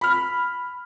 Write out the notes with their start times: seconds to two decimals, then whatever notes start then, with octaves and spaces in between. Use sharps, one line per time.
0.01 B5 F6